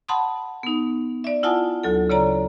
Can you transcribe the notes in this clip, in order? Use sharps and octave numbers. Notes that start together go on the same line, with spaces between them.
F#5 A5 B5 C6 D#6
B3 D#4
D5 E5
E4 F4 F#5 G#5 A5 D#6
D2 F#3 A4
C#3 C#5 D5 A#5